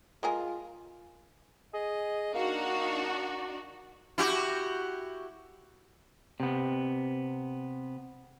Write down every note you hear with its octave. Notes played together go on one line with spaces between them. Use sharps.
G#3 F4 A#4 G#5
G#4 D#5
A#3 D4 D#4 F#4 F5
E4 F#4 G4
C3 B3